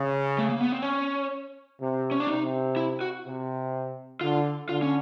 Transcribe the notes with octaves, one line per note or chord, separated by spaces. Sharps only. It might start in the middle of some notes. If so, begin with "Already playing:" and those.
Already playing: C#3
A3
A#3
B3
C4
C#4
C3
C#4
D4
C3 D#4
E4
F#4
C3
D3 F4
D3 F4
C#4